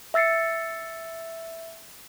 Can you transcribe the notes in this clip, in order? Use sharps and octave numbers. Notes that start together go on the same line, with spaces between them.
E5 E6 A6 C7 C#7